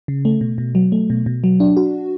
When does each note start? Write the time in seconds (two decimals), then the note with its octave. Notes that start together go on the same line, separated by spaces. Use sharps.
0.08 C#3
0.25 A3
0.41 B2
0.58 B2
0.75 F#3
0.92 A3
1.10 B2
1.26 B2
1.44 F#3
1.60 D4
1.77 F#4